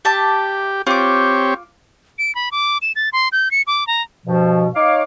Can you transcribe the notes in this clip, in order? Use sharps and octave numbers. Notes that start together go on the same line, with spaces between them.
G4 E5 A5 D6
C4 F4 G4 C#5 D6
D7
B5
D6
E7
A6
C6
G6
C#7
D6
A#5
G2 B2 F3
D#4 C#5 F5 D6